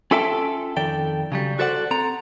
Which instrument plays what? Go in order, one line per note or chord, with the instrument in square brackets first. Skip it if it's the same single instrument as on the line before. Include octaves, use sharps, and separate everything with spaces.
[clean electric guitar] C#4 F4 A4 E5 G5 A5
F2 D#3 A4 D5 G5
C#3 F#3 G3
F#4 A4 C5 D5 D#5 F#5
C4 A4 A#5